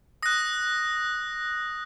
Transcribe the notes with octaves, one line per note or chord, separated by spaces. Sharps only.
D#6 F#6 A#6